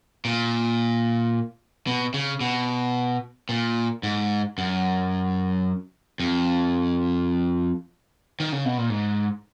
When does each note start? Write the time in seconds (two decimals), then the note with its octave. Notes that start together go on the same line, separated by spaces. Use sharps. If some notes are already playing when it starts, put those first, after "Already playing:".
0.25 A#2
1.87 B2
2.14 C#3
2.41 B2
3.49 A#2
4.03 G#2
4.58 F#2
6.20 F2
8.40 D#3
8.52 C#3
8.65 B2
8.78 A#2
8.90 G#2